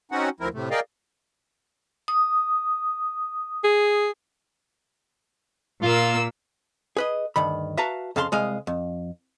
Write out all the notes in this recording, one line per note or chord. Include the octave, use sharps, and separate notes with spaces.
C4 C#4 D#4 F#4 F#5
D2 F3 C4 E4 A#4
A2 C3 A3
G#4 A#4 D5 D#5 F5 G5
D#6
G#4
A#2 A#3 F4 E6
G#4 B4 D#5
D2 G2 D#3 B5
F#4 B4 E5 F5 A5 A#5
F2 C#3 F5 A5 B5 C6
C2 G#3 D#5 F5
F2